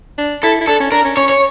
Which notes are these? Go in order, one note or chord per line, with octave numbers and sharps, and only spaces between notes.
D4
E4 A4
E4
D4 A4
C#4
D4 A#4
C#4
C#4 C#5
C#5